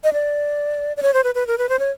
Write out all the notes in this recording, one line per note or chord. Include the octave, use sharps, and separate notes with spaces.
D#5
D5
D5
C#5
C5
B4
B4
A#4
B4
C5
C#5